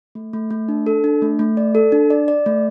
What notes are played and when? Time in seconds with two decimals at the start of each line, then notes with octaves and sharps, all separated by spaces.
0.15 A3
0.33 A3
0.51 A3
0.68 D4
0.87 A4
1.04 D4
1.22 A3
1.39 A3
1.57 D5
1.75 A4
1.92 D4
2.10 D5
2.28 D5
2.46 A3